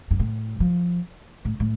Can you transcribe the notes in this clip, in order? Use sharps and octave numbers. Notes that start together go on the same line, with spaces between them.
G2
A2
F3
A2
A2